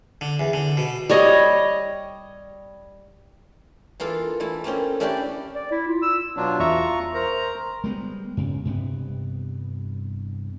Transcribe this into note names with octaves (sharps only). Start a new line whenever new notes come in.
D3
E2
D3
B2
G3 C#5 D#5
E3 A#3 F4 A4
E3 A3 E4
A3 A#3 C4 C#4
A3 C#4 D4 E4 G4 D5
D5
E4
F4
E6
B2 F#3 D4 F4
E2 E5 A#5 C#6
A#4 C5 A#5
G3 G#3 B3
G2 C#3
G2 C3 B3